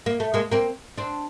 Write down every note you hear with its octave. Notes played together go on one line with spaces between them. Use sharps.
A#3
A3
G#3 A#3
A#3 C4
C4 D4